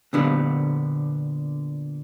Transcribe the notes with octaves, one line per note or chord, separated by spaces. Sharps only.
A#2 D3 B3